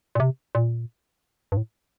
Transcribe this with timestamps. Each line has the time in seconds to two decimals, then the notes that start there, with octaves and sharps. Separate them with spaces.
0.15 A#2
0.20 C3
0.55 A#2
1.52 G2
1.57 A2